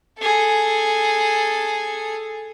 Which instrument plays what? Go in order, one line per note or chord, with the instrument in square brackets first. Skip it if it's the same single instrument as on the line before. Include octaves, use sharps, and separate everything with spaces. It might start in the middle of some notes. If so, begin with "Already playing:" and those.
[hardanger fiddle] G#4 A4